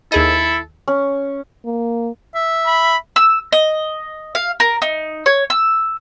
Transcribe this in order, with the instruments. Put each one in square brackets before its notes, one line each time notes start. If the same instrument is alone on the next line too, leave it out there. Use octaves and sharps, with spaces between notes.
[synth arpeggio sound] D#2 G#4 D#5 [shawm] E4 [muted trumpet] A4
[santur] C#4
[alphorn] A#3
[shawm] E5
[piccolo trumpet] B5
[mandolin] E6
D#5
F5
A#4
D#4
C#5
E6